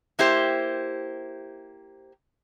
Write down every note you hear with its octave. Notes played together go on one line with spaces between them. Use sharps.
A#3 E4 G4 C5